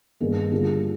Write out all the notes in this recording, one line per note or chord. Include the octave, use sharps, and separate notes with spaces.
G2 D#3 A#3 D#4 G#4
D3 G3 A#3 F4 G#4